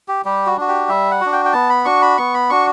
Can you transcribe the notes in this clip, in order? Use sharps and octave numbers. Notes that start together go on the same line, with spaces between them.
G4
G3 G4
F#4
D4 F#4
G4
G3 E5
F#5
D4 F#4
G5
G5
B3 A5
B5
D4 F#4 C#6
B5
B3 C#6
B5
D4 F#4 C#6